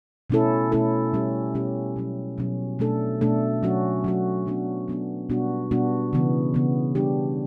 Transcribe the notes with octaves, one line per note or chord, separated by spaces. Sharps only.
B2 A3 C#4 E4 A4
B2 A3 C#4 E4 A4
B2 G3 C#4 G4
B2 G3 C#4 G4
B2 F#3 C#4
B2 F#3 C#4
B2 A3 D4 A4
B2 A3 D4 A4
F#3 C#4 F#4
F#3 C#4 F#4
F#3 B3 D4 F#4
F#3 B3 D4 F#4
B2 G3 B3 D4 F#4
B2 G3 B3 D4 F#4
C#3 E3 B3
C#3 E3 B3
G3 D4 G4